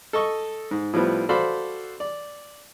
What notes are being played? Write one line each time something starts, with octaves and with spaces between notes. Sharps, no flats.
A4 D#5 C#6
G#2
A2 F3 G3 B3
F#4 A4 C5 D5 F5 B5
D5